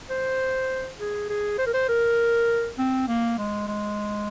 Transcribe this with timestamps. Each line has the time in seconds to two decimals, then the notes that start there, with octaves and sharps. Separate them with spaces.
0.10 C5
1.00 G#4
1.30 G#4
1.58 C5
1.66 A#4
1.74 C5
1.89 A#4
2.79 C4
3.08 A#3
3.38 G#3
3.68 G#3